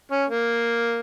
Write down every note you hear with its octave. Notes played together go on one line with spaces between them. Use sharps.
C#4
A#3